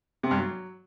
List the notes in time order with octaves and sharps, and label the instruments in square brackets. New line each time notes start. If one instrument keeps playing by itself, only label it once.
[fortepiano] C3
G2
F#3